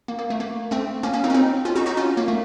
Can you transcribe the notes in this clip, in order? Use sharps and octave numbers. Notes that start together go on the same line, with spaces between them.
A#3
A#3
A3
A#3
A3 C4
A#3 C#4
A#3 C#4
C4 D#4
C#4
C4 D#4
C#4 F4
D#4 F#4
D#4 F#4
C#4 F4
A#3
A3